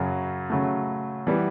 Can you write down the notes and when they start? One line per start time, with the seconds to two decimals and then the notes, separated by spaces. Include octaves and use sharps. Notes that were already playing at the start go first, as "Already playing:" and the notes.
Already playing: F#2 C#3 F#3
0.50 C#3 F#3 A3
1.27 E3 G3 B3